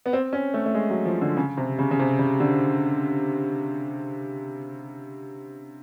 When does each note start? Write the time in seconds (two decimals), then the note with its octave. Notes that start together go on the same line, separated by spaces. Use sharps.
0.06 B3
0.13 C4
0.33 C#4
0.54 A3
0.66 A3
0.75 G#3
0.90 F#3
1.05 F3
1.22 D3
1.37 C#3
1.57 C3
1.78 C#3
1.91 C#3
1.99 C3
2.19 C#3
2.40 D3